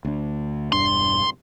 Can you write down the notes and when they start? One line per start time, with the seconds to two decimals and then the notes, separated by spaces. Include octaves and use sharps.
0.05 D2 D4
0.72 E1 G2 D4 C6